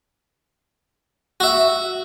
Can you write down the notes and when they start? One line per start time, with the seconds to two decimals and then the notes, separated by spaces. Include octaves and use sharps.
1.40 F#4 E5